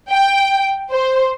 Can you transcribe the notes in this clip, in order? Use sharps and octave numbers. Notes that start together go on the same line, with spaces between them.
G5
C5